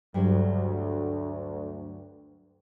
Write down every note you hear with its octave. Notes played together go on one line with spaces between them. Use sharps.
D2 G2 F#3